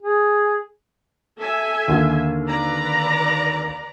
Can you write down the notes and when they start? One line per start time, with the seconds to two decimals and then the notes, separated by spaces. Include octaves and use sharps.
0.02 G#4
1.38 A4 E5 G#5
1.88 D#2 D3 A#3
2.47 B4 D5 A#5